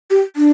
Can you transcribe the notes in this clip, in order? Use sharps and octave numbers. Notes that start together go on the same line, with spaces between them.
G4
D4